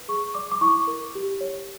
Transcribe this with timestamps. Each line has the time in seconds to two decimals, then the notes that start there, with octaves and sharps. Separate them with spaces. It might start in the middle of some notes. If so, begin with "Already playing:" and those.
Already playing: B4
0.08 G#4 C#6
0.34 D5 D6
0.52 D6
0.61 E4 C#6
0.87 A#4
1.15 G4
1.41 C#5